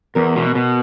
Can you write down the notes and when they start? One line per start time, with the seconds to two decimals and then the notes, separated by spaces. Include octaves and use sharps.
0.15 E2 A#4
0.36 B2
0.55 B2